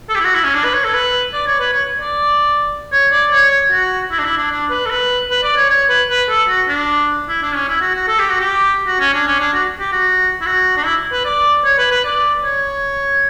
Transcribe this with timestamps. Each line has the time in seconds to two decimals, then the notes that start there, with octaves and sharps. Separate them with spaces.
0.09 A4
0.15 G4
0.20 E4
0.24 F#4
0.34 E4
0.44 C#4
0.54 D4
0.64 B4
0.74 C#5
0.84 A4
0.94 B4
1.33 D5
1.46 C#5
1.60 B4
1.73 C#5
2.00 D5
2.92 C#5
3.12 D5
3.32 C#5
3.72 F#4
4.11 E4
4.19 D4
4.24 E4
4.37 D4
4.51 D4
4.70 B4
4.86 A4
4.90 B4
5.30 B4
5.43 D5
5.56 C#5
5.69 C#5
5.89 B4
6.10 B4
6.29 A4
6.49 F#4
6.68 D4
7.28 E4
7.42 D4
7.55 C#4
7.68 E4
7.81 F#4
7.94 F#4
8.08 A4
8.19 G4
8.30 F#4
8.40 G4
8.87 F#4
9.00 C#4
9.14 D4
9.26 C#4
9.40 D4
9.53 F#4
9.79 G4
9.92 F#4
10.41 E4
10.46 F#4
10.77 D4
10.85 E4
11.12 B4
11.25 D5
11.64 C#5
11.78 B4
11.91 B4
12.04 D5
12.44 C#5